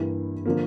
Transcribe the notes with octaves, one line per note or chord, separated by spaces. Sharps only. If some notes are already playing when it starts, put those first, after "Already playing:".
Already playing: G2 E3 A#3 E4 G4
D3 F3 A#3